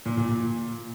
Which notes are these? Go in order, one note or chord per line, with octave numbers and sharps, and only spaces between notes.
A#2
A#2
A#2